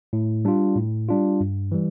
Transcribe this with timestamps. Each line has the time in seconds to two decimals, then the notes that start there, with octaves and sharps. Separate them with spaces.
0.13 A2
0.45 G3 D4 F4
0.76 A2
1.09 G3 D4 F4
1.41 G2
1.72 E3 G3